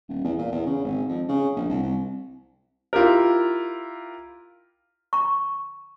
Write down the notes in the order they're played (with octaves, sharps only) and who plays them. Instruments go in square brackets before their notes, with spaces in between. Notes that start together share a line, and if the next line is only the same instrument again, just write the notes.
[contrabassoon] D#1
E2
A#2
E2
C#3
G#1
F2
C#3
A#1
C2
C2
[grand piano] E4 F4 G4 A#4
[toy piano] A#5 C#6